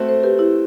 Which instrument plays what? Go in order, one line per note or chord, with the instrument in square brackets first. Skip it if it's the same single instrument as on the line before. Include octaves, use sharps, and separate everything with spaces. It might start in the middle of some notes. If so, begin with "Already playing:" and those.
Already playing: [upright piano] A3 C4 F#4
[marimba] A4 C5
G4 B4
E4 G4